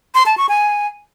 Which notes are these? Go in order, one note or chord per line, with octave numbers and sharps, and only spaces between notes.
C6
A5
C#6
G#5